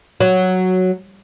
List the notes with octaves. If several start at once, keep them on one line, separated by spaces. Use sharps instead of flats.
F#3